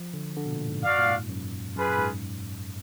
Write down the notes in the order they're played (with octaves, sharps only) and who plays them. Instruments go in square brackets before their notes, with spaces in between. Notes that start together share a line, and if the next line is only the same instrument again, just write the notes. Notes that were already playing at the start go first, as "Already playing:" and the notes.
Already playing: [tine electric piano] F3
D3
D3
B2
A#2
G#2
[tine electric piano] F#2 [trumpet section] F#4 D5 F5
[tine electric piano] A#2
G#2
F#2
[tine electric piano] F#2 [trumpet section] F4 G#4 B4
[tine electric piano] A#2
G#2